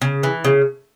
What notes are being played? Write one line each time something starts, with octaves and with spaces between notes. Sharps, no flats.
C#3
E3
C#3